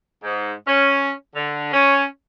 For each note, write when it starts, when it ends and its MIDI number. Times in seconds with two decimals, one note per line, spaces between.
0.24 0.52 44
0.68 1.11 61
1.36 1.70 50
1.73 2.05 61